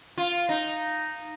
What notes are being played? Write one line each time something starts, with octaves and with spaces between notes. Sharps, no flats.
F4
D#4